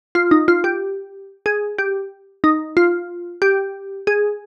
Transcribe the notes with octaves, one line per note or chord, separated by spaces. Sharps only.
F4
D#4
F4
G4
G#4
G4
D#4
F4
G4
G#4